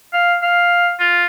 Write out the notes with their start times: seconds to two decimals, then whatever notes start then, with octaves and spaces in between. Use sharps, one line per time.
0.13 F5
0.42 F5
1.00 F4